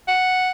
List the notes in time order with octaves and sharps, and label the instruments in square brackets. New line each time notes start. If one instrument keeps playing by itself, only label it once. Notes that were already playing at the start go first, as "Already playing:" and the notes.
[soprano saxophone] F#5